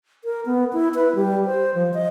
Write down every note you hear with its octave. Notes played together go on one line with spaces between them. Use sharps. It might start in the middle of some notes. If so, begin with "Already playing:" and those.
A#4
B3
E4
B4
G3
C5
F3
D#5